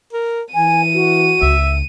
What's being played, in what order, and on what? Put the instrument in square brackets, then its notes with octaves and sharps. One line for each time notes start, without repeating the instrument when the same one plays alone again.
[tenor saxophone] A#4
[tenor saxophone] E3 [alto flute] G#5 [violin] D#7
[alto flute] F#4
[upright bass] C#2 [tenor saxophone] E5